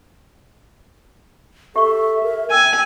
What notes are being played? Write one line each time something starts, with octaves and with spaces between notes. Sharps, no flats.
G4 A4 E5 C#6
A#4
G5 G#5 E6